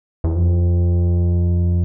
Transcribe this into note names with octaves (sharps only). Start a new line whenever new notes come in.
E2
F2